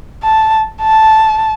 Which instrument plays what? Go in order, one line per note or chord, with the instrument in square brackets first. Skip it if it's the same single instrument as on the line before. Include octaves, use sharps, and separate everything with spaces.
[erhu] A5
A5